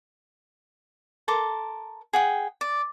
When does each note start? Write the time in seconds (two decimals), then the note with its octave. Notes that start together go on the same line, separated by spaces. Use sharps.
1.28 A4 A#4 C6 D6
2.13 G#4 F#5 G5
2.61 D5